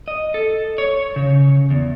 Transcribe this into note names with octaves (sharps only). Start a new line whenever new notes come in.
D#5
A4
C#5
C#3
E2